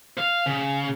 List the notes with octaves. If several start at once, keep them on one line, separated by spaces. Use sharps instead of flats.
F5
C#3